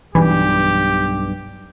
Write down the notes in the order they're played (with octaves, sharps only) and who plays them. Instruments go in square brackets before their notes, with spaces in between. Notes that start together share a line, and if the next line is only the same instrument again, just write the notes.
[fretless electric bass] B1 G2 [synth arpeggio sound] E3 [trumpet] G4